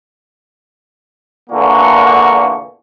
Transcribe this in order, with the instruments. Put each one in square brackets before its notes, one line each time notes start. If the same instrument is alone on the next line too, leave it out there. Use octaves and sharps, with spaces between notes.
[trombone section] E2 A#2 D3 [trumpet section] A#3 F#5 C#6